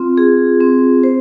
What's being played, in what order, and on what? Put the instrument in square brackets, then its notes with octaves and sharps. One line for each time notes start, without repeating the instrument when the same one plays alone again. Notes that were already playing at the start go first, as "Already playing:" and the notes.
Already playing: [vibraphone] C4 F4
G#4
C4
C5